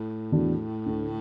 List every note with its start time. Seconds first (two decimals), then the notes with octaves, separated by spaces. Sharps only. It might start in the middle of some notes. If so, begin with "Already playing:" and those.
Already playing: A2
0.32 E2 E3 D4 F#4
0.86 D2 D3 A3